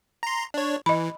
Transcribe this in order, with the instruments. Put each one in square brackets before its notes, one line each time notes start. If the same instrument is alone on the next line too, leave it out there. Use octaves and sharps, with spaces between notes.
[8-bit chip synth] A#5 C6
D4 C#5
[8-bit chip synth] E3 [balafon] D#5 B5